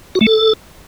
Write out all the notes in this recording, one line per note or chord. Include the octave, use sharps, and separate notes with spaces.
F#4
A3
A4